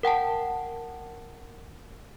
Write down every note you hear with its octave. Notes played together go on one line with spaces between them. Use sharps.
A#4 F#5 G5 A5